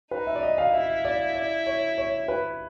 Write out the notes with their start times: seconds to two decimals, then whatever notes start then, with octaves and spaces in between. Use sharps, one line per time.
0.11 D#4 B4
0.27 E5
0.35 D5
0.43 D#5
0.58 F5
0.73 E4 E5
1.05 D5
1.35 D5
1.67 C#5
1.98 C#5
2.28 B4